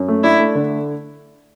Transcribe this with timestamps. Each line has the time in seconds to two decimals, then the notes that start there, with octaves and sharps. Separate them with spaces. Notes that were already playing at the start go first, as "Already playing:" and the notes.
Already playing: F#2
0.08 A3
0.23 D4 E4
0.40 A3
0.55 D3